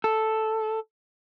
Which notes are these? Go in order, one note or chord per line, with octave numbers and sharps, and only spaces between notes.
A4